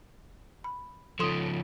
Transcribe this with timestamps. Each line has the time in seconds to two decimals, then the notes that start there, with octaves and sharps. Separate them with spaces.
0.64 B5
1.19 C#3 F3 A4 C6 D#6